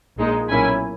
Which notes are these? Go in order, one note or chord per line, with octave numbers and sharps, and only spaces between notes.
A#1 A#2 G#3 D#4
B1 A#2 A#3 C#4 E4 G#5 B5